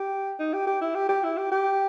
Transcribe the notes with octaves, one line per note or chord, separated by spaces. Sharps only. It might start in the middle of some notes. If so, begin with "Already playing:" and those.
Already playing: G4
D#4
G4
G4
E4
G4
G4
E4
G4
G4